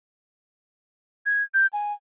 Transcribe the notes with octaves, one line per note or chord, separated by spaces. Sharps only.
G#6
G6
G#5